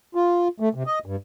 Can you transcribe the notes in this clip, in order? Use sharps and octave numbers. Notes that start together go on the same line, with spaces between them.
F4
A3
C3
D#5
G2